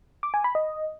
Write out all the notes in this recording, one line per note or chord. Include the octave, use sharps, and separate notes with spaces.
D6
G#5
B5
D#5